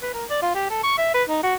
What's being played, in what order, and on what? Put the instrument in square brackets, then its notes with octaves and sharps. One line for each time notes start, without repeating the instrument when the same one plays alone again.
[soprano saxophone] B4
A#4
D5
F4
G4
A4
C#6
E5
B4
D#4
F#4